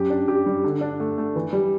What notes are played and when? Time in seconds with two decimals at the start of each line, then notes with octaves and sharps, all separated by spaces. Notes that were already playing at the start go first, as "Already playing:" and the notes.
Already playing: F#2 G4
0.10 D4
0.28 G4
0.46 G3
0.64 D3
0.81 D4
1.00 A3
1.18 A3
1.36 E3
1.53 G3